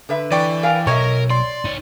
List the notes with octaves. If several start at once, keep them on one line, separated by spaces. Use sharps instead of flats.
D3 B4 E5
E3 D5 G5 C#6
A#4 F5 G#5
B1 A#4 C#5 D#5 E5 C#6
D5 C6
D#4 C#5